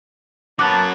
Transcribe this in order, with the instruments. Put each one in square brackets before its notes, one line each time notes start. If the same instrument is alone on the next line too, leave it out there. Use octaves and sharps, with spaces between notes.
[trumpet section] A#3 B3 A5 [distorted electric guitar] C#4 F#4 [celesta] D6 F#6